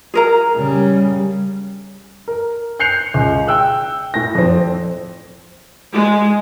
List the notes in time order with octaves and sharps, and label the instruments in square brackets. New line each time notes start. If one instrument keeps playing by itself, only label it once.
[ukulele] G#4 A#4 A#5
[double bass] C#3 G3
[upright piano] A#4
F#6 G6 C7 C#7 F7
C#2
G5 E6 F#6
A2 A#6
F2 C4
[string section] G#3